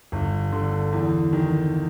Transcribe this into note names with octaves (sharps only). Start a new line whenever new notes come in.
G1
D3
E2
D#3